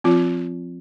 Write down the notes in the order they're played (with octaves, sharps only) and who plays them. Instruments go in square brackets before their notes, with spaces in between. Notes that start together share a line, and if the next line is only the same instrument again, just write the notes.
[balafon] F3 C4 F4